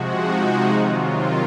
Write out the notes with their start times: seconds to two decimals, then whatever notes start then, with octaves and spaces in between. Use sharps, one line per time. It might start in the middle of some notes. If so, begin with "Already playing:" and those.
Already playing: C3 F3 G#3 F#4
0.18 D#4
0.72 C3 D#3 F#3 F4